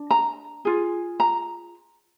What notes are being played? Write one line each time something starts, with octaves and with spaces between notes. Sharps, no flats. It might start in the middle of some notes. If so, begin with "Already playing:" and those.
Already playing: D4
A#5
F4 G#4
A#5